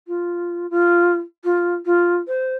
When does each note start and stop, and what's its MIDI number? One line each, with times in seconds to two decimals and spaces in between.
0.07 0.69 65
0.70 1.15 65
1.44 1.73 65
1.85 2.16 65
2.27 2.56 72